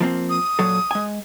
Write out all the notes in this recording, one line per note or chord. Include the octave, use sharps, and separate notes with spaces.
F3 A#3 C4
D#6
A#2 F#3 A4
G#3 G#5